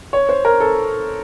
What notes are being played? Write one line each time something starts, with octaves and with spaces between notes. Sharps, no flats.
C#5
C5
A#4
A4